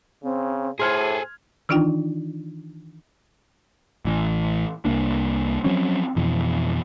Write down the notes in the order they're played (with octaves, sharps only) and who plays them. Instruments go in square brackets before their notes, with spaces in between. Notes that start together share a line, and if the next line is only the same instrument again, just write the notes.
[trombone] C#3 [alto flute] C4
[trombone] A2 [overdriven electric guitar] G#4 A4 [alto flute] C5 [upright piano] C6 F6 G#6
[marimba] D#3 E3 D4 D#4 F4 G5
[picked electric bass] A1 E3
C2 A#3 D4
F3 F#3 C4 C#4
F2 B2 E3